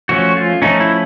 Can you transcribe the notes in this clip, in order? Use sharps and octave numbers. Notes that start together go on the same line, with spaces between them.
F3 A3 C#4 F#4
F4
F3 A3 C#4 D#4
E4